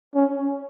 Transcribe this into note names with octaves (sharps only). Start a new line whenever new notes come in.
C#4